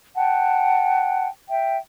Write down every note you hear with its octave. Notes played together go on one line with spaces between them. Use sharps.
F#5 G5 A5
E5 G5